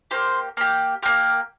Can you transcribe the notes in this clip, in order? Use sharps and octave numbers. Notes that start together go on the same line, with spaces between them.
A#3 G4 C5
A#3 G4
A#3 G4 A#4